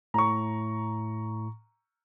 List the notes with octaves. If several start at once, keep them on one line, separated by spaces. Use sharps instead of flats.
A2 A#5 C#6